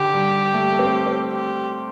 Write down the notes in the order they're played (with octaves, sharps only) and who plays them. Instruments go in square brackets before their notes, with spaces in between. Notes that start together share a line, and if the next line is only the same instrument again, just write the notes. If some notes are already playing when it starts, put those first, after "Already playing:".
Already playing: [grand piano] D3 [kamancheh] G4
[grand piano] G3
A3
A3
C4
C4
[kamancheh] G4